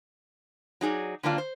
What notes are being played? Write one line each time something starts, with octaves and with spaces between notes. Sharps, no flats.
F#3 D#4 G#4 D5
D3 F#3 A#3 C4 D4 F4
C5